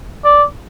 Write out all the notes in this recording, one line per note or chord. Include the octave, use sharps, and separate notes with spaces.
D5